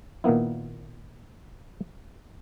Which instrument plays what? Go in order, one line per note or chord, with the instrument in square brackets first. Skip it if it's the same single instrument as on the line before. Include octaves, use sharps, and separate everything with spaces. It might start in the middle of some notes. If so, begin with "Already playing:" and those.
[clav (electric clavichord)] A#2 D#3 A#3 B3 E4